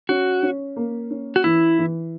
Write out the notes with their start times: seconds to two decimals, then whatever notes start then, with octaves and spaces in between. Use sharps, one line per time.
0.09 C#4 F#4
0.43 C#4
0.76 A#3
1.11 C#4
1.36 F#4
1.44 E3 E4
1.79 E3